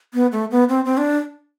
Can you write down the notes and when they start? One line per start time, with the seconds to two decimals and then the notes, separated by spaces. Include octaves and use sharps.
0.14 B3
0.32 A3
0.51 B3
0.69 C4
0.85 C4
0.98 D4